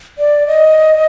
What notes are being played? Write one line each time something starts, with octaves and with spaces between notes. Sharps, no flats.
D5
D#5